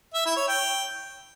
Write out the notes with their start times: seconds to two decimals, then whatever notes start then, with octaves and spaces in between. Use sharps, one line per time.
0.14 E5
0.25 E4
0.37 C#5
0.48 G5